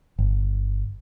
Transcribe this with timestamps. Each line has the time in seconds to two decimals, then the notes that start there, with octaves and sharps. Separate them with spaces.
0.19 G1